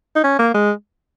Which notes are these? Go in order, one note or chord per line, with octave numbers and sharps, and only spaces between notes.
D#4
C#4
A#3
G#3